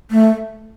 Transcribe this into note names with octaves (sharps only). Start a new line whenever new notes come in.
A3